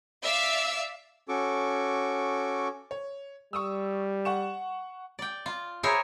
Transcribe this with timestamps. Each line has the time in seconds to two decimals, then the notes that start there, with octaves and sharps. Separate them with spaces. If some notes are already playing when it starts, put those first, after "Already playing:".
0.24 D5 E5 F5 E6
1.29 C#4 F#4 A4 C#6 D6
2.91 C#5
3.53 G3 C#6 D#6 E6
4.25 F#5 C#6 E7
5.19 D5 G5
5.46 F4
5.83 E4 G#4 A#4 C5 C#5